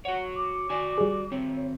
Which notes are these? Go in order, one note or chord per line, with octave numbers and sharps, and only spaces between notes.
F#4 C#5 F#5
D6
F#4 D5 G#5 D#6
G3 G#4
D#3 C4 C#5